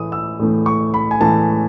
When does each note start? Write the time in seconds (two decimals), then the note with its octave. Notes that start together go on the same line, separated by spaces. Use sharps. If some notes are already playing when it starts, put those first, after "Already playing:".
Already playing: A2 E3 A3 D#6
0.12 E6
0.39 A2 E3 A3
0.66 C#6
0.94 B5
1.11 G#5
1.20 A2 E3 A3 A5